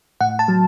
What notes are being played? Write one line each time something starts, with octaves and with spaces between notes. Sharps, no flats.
A2 F#5
A5
F#3